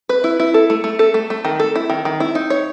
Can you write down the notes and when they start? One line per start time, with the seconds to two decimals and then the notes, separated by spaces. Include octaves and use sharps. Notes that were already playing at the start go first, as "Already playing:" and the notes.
0.09 B4
0.24 E4
0.40 E4
0.54 A4
0.70 A3
0.84 A3
0.99 A4
1.14 A3
1.30 A3
1.45 D#3
1.60 A4
1.75 E4
1.90 D#3
2.05 D#3
2.20 E4
2.35 D#4
2.50 C#5